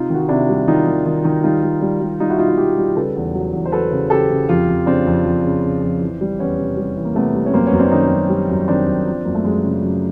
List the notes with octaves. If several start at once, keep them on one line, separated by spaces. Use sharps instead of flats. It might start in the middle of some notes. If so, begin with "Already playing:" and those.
Already playing: C3 D#4 F4
D#3 F#4
F4
C3 D4 E4
G3
D#3 D#4 F4
D#3
D#3
D#3
G3 D#4 F4
G3
G3
G3
G3 D#4 F4
E4 F#4
B2 D#4 F4
E4 F#4
G3 F4 G4
G3
C#3 A4 B4
E2
F#3
E2
C5
F#3 A4 B4
C#3
C#3 G4 A4
C#3
F2 F4 G4
F2
C#3 C4 D4
F2
F2
C#3
C#3
F2
E3
G3
E2 B3 C#4
C3
G3
E3
A#3
C3 A3 B3
G3
C#4
F#2 A#3 C4
B3 C#4
F#2
C4 D4
D#3 C#4 D#4
F#2
G3
F#2
D#3 C4 D4
F#2
F3
F#2 A#3
A3
F#2 G#3
C#3
F#2